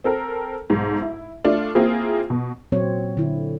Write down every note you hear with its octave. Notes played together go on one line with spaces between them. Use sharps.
C4 A4 A#4
B1 G#2
E4
A3 D4 F4
A#3 C4 E4 F4 G#4
B2
A#2 F#3 C4 C#5
D3 E4